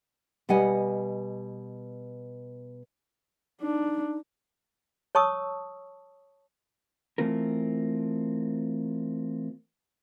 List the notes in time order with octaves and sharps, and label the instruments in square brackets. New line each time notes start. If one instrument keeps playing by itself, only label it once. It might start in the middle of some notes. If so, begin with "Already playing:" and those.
[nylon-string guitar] B2 G3 D#5 F#5 G#5
[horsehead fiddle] D4 [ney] D#4
[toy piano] C#5 A5 C#6 D#6 E6
[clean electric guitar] E3 A3 C4 F4 A#4